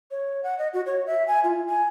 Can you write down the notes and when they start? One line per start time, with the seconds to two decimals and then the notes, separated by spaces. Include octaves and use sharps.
0.11 C#5
0.43 F#5
0.59 D#5
0.73 F#4
0.86 C#5
1.06 E5
1.28 G#5
1.44 F4
1.67 G#5